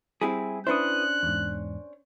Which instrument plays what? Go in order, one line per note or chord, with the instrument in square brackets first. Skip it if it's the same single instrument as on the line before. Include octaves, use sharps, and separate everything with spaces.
[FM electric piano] G3 [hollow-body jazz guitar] C4 E4 G#4
[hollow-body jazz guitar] C#4 D4 C5 [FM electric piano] E4 B4 D#6 [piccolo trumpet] F#6
[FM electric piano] E2 G#2